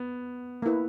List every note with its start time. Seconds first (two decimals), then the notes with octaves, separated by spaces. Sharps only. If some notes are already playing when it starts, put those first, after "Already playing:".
Already playing: B3
0.62 A#3 E4 B4